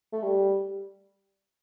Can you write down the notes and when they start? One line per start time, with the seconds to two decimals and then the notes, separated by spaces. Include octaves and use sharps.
0.13 A3
0.22 G3